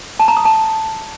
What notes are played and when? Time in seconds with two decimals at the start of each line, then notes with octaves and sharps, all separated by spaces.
0.19 A5
0.28 A#5
0.37 D#6
0.45 A5